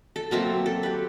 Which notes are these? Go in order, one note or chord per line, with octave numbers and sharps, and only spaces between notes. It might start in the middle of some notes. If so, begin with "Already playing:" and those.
A4
F#3 A#3 C4 E5
A4
G4 B4